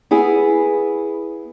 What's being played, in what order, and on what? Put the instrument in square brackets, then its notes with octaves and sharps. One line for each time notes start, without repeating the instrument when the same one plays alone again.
[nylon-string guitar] B3 E4 G#4